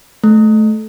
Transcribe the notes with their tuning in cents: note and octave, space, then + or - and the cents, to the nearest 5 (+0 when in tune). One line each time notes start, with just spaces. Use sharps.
A3 -20